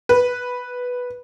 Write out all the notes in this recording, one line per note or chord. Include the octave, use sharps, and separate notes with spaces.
B4